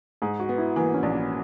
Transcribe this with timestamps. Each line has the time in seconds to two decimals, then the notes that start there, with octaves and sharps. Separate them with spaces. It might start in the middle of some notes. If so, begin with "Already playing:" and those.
0.22 G#2 G#4
0.40 F#4
0.49 B3
0.58 E4
0.76 E3 A#3
0.94 C#4
1.03 A#1
1.13 A#3